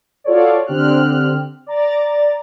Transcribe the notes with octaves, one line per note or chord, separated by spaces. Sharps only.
F4 F#4 A4 C#5 D5
D3 C4 G4 F6 F#6
D5 A#5 A6